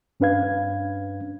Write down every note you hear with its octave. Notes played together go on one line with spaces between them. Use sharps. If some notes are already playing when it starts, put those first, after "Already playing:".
G2 C#4 D4 B4 F5 G#6